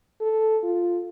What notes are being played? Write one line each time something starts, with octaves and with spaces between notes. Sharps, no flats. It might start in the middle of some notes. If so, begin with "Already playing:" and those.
A4
F4